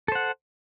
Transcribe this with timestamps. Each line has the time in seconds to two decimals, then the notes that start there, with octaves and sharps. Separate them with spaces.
0.08 A4
0.12 C5
0.15 F#5